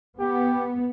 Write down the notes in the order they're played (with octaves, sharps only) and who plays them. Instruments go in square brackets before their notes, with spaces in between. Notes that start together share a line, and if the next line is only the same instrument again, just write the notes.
[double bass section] B3 [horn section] G4